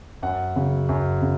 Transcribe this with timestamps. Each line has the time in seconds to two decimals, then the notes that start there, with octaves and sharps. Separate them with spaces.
0.23 F#2 F#5
0.56 C#3 F#3
0.89 F#2
1.22 C#3